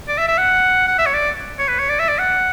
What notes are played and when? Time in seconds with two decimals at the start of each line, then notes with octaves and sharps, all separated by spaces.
0.08 D5
0.18 E5
0.28 E5
0.38 F#5
0.88 F#5
0.99 E5
1.06 C#5
1.14 D5
1.59 C#5
1.68 B4
1.79 C#5
1.89 D5
1.99 E5
2.09 D5
2.18 F#5